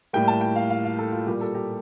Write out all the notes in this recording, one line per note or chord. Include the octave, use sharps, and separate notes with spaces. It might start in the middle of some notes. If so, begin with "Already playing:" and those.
A2 G3 A#3 G5
A5
G5
F5
F5
F5
A4
F4
A#2 G3 A#3 G4
A4
G4